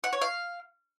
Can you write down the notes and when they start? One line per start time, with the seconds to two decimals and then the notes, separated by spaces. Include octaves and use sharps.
0.04 F#5
0.13 C#5
0.22 F5